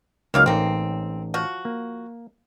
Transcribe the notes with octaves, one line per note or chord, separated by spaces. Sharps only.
C#2 D#3 F#3 A#3 F5
A1 A#3 C4 D#4
F3 F#4
A#3